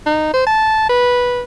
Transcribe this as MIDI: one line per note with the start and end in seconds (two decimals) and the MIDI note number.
0.06 0.30 63
0.34 0.46 72
0.47 0.89 81
0.89 1.41 71